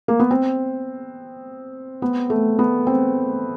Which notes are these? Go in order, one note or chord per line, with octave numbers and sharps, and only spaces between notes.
A#3
B3
C4
B3
A3
B3
C4